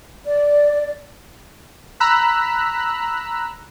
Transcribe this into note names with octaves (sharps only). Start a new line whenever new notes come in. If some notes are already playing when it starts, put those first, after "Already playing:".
D5
A#5 B5 E6 F#6 B6